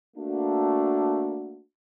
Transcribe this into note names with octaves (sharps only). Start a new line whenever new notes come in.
A3 A#3 D4 F#4